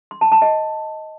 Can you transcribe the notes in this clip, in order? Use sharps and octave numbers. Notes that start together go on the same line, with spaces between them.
C6
A5
A5
D#5